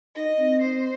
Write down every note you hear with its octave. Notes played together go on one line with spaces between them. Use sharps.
D#4 D#5
C4
C5